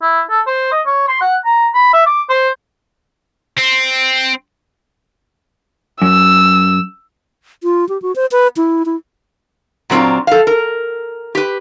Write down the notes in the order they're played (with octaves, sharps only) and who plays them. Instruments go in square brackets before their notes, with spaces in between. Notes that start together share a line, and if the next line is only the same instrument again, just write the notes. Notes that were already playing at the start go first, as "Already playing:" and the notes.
[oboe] E4
A4
C5
D#5
C#5
C6
F#5
A#5
B5
E5
D6
C5
[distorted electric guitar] C4
[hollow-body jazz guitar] F#2 [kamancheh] E6
[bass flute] F4
G4
F#4
C5
B4
E4
E4
[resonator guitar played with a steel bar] A#2 F#3 C4 D4 F4
A4 F5
A#4
G4 B4